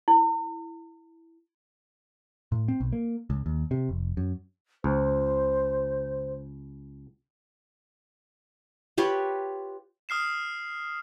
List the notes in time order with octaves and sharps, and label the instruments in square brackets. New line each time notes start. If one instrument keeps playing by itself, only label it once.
[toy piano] E4
[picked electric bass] A2
C4
B1
A#3
C#2
D#2
C3
F1
F#2
[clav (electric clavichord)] C#2 [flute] C5
[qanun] F4 G4 B4 C#5
[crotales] D#6 F6 C7 E7